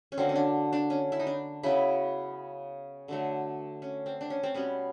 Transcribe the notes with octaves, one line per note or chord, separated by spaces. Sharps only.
C#4
D3 F#3 A#3 C4
C#4
D4
D4
C#4
E4
D#4
D4
C#3 F#3 B3 E4
D3 F#3 A3
C#4
C4
D4
C#4
C4
B2 G3 B3 C#4